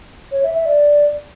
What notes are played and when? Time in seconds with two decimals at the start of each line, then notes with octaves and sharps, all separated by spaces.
0.32 C#5
0.43 E5
0.54 E5
0.66 D5